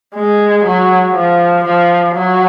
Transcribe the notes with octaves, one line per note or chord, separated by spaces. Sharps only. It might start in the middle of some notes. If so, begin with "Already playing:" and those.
G#3
F#3
F3
F3
F#3